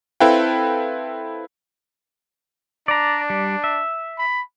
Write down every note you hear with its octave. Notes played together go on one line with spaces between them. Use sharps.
C4 E4 A4 B4 F5 G5
D4 D5 A#5
G3
E5
B5